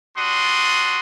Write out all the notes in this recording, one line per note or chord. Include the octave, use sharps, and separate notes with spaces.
G3 D4 F#4 C6 D#6